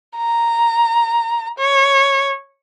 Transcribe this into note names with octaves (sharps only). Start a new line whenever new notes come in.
A#5
C#5